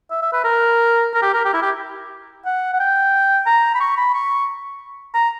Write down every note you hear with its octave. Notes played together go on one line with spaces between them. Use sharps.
E5
E5
B4
A#4
A#4
G4
A#4
G4
E4
G4
F#5
F#5
G5
A#5
B5
C#6
B5
C#6
A#5